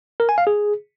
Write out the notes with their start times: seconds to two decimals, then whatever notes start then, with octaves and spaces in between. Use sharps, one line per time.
0.20 A#4
0.29 G#5
0.38 F5
0.47 G#4